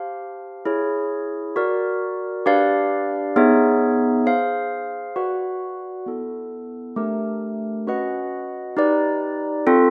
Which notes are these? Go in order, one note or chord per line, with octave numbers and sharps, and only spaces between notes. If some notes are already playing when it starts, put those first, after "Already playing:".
Already playing: G4 C5 F5 A5
E4 G#4 C#5
F#4 A#4 D5
D4 G4 B4 D5 F5
B3 D#4 G#4 C#5 E5
G#4 C5 F5
F#4 B4 D5 F#5
B3 E4 A4
A3 D4 G4 A#4
C#4 F#4 B4 D#5 F#5
D#4 G4 B4 D5
C4 F4 A4